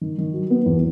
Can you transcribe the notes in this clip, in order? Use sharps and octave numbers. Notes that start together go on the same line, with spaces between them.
D#3
D#3
F#3
B3
E2